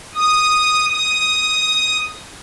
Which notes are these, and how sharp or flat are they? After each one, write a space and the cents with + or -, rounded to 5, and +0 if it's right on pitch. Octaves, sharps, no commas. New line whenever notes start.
D#6 -5
D#6 +5